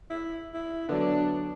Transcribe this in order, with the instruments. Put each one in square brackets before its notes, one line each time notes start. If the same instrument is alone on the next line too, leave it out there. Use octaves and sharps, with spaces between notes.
[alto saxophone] E4
E4
[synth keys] D3 F#3 [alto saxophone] B3 [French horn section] D4